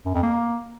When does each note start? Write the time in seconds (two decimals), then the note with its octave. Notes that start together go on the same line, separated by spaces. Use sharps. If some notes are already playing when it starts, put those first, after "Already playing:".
0.06 F#2
0.14 F2
0.23 A#3